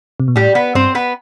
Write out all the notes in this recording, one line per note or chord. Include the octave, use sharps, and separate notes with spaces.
C3
B2
A2 G3 G4
B3 B4
G2 C4 C5
B3 B4